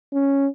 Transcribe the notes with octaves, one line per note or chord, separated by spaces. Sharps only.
C#4